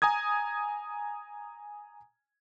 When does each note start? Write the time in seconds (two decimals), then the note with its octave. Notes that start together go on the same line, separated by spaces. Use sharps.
0.02 G#5 A#5 D#6 G#6